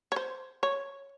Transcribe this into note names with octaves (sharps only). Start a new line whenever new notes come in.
C#5
C5
C#5